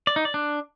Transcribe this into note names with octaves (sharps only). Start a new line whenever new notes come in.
D5
D#4
D5
D4